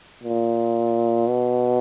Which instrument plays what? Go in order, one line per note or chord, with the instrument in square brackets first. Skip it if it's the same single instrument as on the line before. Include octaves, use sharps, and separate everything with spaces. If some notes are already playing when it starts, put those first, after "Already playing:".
[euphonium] A#2
B2